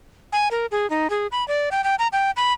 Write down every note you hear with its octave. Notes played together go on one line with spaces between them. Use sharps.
G#5
A#4
G#4
D#4
G#4
B5
D5
G5
G5
A#5
G5
B5